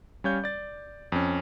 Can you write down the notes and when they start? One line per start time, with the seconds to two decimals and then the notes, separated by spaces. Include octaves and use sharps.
0.24 G3 C#4 C#5 F5 G6
0.44 D5 A6
1.12 F2 C#4